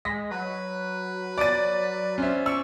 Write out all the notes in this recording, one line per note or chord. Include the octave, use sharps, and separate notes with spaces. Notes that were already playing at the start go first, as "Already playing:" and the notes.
G#3 A#6 B6
F#3 B4
D5 D6 A6 D7 D#7
C#4 F4 C5 E5
D5 C#6 E6